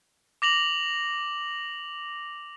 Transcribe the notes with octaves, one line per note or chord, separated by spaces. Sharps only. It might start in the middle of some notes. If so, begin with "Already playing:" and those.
D6 A#6 F7 F#7